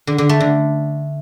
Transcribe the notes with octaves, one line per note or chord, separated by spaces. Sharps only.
D3
D3
A3
D3